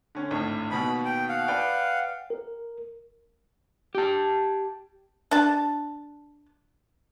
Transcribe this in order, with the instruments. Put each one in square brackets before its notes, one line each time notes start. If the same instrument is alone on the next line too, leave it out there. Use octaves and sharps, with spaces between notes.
[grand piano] D3 C#4
G#1 D2 A2
[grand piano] D#2 B2 F#4 [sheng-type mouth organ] B5
[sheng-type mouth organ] G5
F5 F#5
[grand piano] B4 D5 G5
[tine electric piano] A#4
[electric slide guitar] G4 A5
[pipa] D4 A5